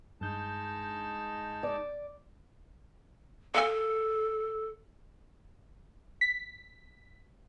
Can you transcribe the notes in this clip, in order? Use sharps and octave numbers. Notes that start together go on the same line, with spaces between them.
G2 G#3 D#4 A5 G6
D5
A4 A#4 F5 G#5
B6